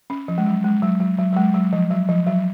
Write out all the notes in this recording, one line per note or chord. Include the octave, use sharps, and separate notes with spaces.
C#4
F3
G#3
F#3
G#3
F#3
F#3
F#3
F#3
G#3
F#3
F3
F#3
F3
F#3